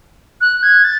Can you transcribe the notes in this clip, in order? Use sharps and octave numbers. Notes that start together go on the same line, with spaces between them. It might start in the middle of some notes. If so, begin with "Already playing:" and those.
F#6
G#6
A6